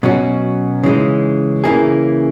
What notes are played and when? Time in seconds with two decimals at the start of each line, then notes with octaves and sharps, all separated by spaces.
0.03 B2 F#3 C#4 F#4
0.83 C#3 E3 G#3 D#4
1.64 C#3 E3 A#3 E4 G#4